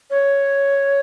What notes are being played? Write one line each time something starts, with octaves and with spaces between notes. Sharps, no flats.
C#5